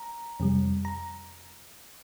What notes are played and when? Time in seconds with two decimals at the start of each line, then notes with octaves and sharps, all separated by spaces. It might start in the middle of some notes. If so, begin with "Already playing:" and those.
Already playing: A#5
0.40 F2 C3 G3
0.85 A#5